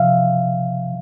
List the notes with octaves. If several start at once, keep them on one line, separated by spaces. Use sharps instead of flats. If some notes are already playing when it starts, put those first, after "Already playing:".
Already playing: C3 F3 E5 F5